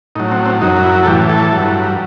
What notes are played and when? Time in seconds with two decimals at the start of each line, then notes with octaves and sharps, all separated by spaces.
0.16 A2 F#3 D#4
0.31 C4
0.46 C4
0.61 F#2 F#3 D#4
0.84 E4
1.03 A4
1.06 A2 E3 G4
1.29 A4
1.52 G2 F#3